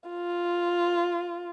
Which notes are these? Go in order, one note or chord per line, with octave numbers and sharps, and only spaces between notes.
F4